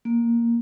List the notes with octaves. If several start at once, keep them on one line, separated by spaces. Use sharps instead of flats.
A#3